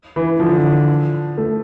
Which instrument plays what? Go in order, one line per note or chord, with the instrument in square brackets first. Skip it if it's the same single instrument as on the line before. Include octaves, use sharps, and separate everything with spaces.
[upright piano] E3
[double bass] D3 [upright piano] F3
[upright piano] A3